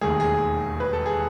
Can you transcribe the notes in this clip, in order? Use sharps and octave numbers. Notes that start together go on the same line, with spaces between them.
E1 D#2 D#3 A3 G#4
G#4
B4
A4
G#4